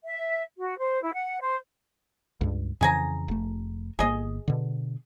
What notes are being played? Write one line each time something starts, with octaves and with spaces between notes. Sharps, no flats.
E5
F#4
C5
E4
F#5
C5
C#2 G2
F2 C#3 E3 G#4 G#5 A#5
F1 A3
G1 A#3 G#4 D#5
B2 D3